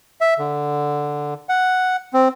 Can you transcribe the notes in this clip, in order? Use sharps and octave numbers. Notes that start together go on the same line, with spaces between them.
E5
D3
F#5
C4